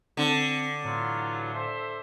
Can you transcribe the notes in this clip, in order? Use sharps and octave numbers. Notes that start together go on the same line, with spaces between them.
D3 C4
A2 E3 F#3 F4
A4 C5 E5